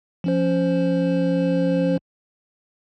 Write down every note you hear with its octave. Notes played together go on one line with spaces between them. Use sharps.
F3 C#4 C5